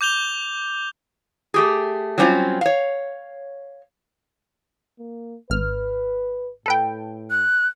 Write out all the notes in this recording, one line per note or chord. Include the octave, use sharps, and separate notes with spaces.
D6 G6 F7 G7
A3 G4 G#4
F#3 G3 C4 C#4 E4 F4
C#5 F5
A#3
G#1 B4 F6
A2 A4 B4 G5
F#6